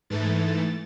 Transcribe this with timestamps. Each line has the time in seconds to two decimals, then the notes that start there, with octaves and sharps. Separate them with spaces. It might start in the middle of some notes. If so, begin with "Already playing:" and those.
0.10 G#2 E3 A3 A6
0.41 A6